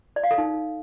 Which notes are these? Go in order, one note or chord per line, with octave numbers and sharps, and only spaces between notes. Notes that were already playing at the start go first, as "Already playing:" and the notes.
D5
F5
A4
D#4